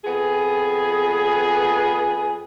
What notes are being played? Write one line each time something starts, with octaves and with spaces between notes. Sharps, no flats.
F2 B3 G#4